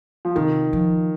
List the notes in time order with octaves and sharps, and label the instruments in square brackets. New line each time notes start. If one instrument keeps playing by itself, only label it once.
[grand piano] F3
[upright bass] C3 [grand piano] D#3
[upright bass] F3